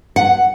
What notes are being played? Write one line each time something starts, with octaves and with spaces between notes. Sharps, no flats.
F#5